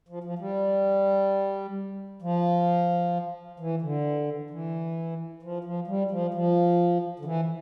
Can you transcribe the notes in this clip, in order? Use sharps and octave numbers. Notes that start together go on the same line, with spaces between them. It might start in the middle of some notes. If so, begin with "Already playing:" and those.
F3
F3
G3
F3
E3
D3
E3
F3
F3
G3
F3
F3
D3
E3